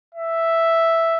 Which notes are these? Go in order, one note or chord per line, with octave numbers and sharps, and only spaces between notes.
E5